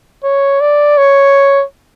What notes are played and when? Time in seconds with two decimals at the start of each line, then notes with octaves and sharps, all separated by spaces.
0.24 C#5
0.61 D5
0.98 C#5